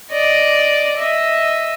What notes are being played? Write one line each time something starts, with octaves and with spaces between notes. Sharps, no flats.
D5 D#5
D#5 E5